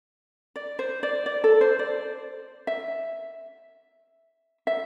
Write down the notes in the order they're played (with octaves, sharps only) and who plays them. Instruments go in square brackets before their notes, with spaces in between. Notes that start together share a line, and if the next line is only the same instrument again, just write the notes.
[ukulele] D5
C5
D5
D5
A4
C5
D5
E5
E5